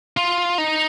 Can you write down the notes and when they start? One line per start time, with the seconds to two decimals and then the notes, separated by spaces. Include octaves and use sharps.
0.17 F4
0.58 D#4